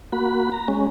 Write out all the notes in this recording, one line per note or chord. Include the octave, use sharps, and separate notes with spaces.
A#3 F#4 B5
A#5
G#3 C#4